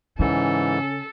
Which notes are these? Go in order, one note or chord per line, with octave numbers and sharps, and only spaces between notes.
G#2 C#3 E3 C#4 A4